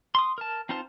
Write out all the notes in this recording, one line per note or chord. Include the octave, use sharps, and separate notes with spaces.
C6 D#6
A#4 A5
C4 D#4 F4 C5 A5